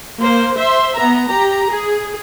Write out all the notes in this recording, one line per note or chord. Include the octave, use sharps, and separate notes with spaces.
A#3 C5
C5 E5 C6
B3 A#5
G4 A#5
G#4